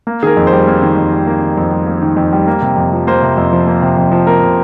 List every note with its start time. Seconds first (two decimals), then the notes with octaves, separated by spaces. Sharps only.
0.07 A#3
0.22 D#3 G#4
0.27 A#4
0.37 F2
0.47 C5
0.53 G3
0.68 A#3
0.82 D#3
0.97 F2
1.13 G3
1.27 A#3
1.42 D#3
1.57 F2
1.72 G3
1.87 A#3
2.02 D#3
2.17 F2
2.33 G3
2.47 A#3
2.62 C3
2.76 F2
2.93 F3
3.07 A#3 C5
3.22 C3
3.37 F2
3.53 F3
3.67 A#3
3.82 C3
3.98 F2
4.12 F3
4.27 A#3 A#4
4.42 C3